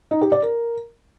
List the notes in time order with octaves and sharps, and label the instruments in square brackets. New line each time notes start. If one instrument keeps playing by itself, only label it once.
[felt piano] D#4
G4
D5
A#4